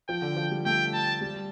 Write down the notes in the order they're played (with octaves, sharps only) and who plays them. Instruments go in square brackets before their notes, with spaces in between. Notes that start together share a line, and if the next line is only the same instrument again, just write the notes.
[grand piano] F3 [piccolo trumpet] G5
[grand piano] D3
F3
G3
[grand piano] A3 [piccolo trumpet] G5
[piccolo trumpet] A5
[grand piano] G3